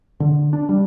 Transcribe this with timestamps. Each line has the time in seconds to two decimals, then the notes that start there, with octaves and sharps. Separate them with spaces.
0.20 D3
0.53 D4
0.69 G3